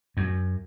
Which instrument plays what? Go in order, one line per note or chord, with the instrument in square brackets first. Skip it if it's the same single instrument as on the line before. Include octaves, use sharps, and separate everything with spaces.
[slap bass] F#2